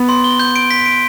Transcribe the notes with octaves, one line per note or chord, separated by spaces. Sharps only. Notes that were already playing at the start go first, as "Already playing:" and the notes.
Already playing: B3
C6
G7
G6
D7
B6
D7